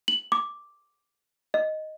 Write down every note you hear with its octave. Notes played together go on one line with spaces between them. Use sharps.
F#7
D6
D#5